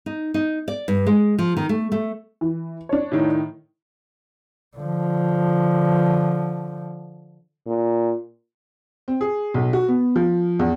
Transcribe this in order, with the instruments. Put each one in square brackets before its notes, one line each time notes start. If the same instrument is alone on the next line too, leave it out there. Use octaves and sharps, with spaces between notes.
[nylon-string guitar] D#4
D#4
D5
G2
G#3
F3
D#3
A3
A3
[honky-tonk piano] E3
D4 C#5
[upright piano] A2 D#3
[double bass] D3 F3
[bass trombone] A#2
[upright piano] C4
G#4
B1
F#4
B3
F3
E2